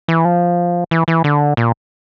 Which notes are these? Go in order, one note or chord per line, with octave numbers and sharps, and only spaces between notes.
E3
F3
E3
E3
D3
A#2